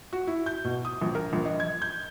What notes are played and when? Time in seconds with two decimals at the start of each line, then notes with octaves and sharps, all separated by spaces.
0.13 F#4
0.27 E4
0.46 G6
0.65 B2
0.85 D#6
1.02 A#1
1.15 A#4
1.33 A#1
1.45 D#5
1.60 G#6
1.82 G6